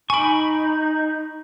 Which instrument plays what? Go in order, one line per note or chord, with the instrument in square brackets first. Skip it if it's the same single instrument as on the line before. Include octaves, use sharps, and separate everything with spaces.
[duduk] D#4 [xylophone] G#5 D7 [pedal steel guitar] B5 C#6